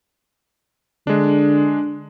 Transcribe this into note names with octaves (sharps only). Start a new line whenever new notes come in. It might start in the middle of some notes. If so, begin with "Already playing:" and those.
D3 G#3 D4